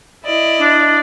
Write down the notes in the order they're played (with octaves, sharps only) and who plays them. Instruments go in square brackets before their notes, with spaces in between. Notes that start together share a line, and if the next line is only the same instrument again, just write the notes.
[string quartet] E4 D5 D#5
[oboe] D4